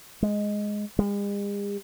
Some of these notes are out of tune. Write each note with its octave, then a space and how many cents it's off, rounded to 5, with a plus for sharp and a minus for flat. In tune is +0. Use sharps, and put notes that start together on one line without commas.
G#3 +0
G#3 -45